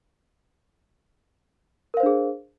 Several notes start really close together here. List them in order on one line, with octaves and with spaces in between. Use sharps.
A#4 F5 C5 D4 G#4